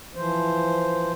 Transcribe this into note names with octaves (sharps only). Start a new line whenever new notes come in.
E3 F3 C5